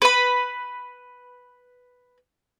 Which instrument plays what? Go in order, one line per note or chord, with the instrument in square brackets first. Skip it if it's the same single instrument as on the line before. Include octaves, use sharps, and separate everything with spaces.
[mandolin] B4 B5